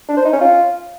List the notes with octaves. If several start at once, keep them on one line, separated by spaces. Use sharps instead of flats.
D4
C5
D#4
C#4
F4